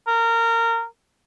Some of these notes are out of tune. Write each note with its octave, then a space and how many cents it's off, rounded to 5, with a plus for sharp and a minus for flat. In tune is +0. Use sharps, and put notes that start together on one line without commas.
A#4 -20